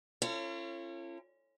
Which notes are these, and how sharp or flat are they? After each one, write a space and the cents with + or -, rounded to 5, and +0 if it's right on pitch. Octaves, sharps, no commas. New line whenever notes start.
C#4 -25 F4 -45 A4 +35